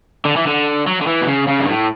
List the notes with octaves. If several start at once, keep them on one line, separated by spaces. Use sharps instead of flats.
D3
E3
D3
F#3
D3
E3
B2
C#3
C#3
G2
A2